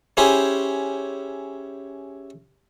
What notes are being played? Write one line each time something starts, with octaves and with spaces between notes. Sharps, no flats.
C#4 E4 G4 G#4 C5